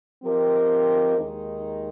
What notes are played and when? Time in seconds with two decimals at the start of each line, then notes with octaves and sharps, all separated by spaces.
0.23 F3 C4 G4 A#4 D#5
1.18 D#2 D#3 G#3 D#4